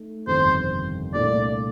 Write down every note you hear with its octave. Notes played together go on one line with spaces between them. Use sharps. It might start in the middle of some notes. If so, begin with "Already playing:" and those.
Already playing: A3 D#4
G1 F2 C3 D#3 C5
C2 A#2 A3 D4 D5